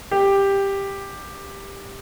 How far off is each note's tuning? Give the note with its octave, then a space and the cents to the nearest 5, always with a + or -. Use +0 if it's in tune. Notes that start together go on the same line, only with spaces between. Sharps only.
G4 +10